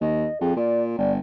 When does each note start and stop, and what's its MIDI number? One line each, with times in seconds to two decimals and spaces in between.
0.01 0.27 39
0.01 0.39 75
0.41 0.55 41
0.41 0.52 68
0.56 0.94 46
0.56 0.83 74
0.98 1.18 31
0.98 1.12 74